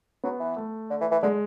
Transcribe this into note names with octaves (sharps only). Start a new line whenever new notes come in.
F#3 B3
E3
A3
D3
E3
E3
D3 G#3